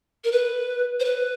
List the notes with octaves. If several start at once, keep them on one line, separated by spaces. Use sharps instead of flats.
A#4
B4
C5
B4